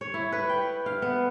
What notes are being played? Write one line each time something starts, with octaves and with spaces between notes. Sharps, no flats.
C#5
E4
B4
G5
F5
B3